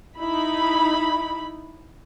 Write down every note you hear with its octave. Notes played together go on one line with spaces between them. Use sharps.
D#4 E4 B5